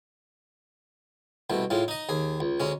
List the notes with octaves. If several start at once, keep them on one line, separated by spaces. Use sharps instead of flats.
C2 B2 A3
A2 G#3 F4
D#4 D#5
D#2 G#4
C#2
D2 G#3 C#4